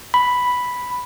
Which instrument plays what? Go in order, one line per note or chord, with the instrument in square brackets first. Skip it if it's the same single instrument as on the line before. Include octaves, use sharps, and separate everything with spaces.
[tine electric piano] B5